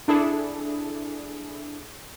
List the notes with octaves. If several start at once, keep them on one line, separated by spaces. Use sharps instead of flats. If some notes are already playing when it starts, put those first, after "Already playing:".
D4 E4 G#4 A4